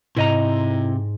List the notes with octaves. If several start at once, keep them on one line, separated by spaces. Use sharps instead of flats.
G#2 C3 E4 D#5 A#5